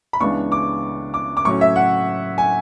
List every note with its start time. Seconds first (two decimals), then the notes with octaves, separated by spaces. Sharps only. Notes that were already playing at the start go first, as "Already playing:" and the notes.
0.13 B5
0.21 C#2 C#3 E3 B3 D4 C#6
0.52 D6
1.14 D6
1.37 D6
1.45 A2 F#3 C#4 C#6
1.61 E5
1.76 F#5
2.38 G#5